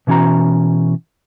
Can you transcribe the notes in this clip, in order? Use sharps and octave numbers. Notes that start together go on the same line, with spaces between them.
B2 E3 C#4 F#4 A#5